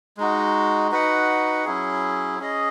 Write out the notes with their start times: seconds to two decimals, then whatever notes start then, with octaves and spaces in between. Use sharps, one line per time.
0.17 G#3 D#4 F#4
0.91 D#4 F#4 B4 F#5
1.65 F#3 C#4 E4 G#4
2.39 C#4 G#4 D#5